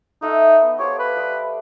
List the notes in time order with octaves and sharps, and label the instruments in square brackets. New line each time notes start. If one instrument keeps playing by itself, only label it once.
[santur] A3 E5 F#5 [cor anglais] D#4
[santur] D#6
B3 D#5
[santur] G4 C5 F5 [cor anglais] C#5
[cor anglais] B4
[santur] G3 D#5